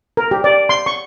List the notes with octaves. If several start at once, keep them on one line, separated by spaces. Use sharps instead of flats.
A#4
G4
D5
C6
C#6